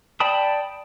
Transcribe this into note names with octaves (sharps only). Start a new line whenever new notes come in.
D5 G5 A5 B5 D#6